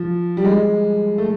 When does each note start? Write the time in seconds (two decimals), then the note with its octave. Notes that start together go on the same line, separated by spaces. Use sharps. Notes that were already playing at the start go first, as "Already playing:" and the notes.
Already playing: F3
0.37 G3
0.44 G#3
1.18 A3